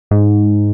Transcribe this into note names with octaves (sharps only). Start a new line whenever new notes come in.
G#2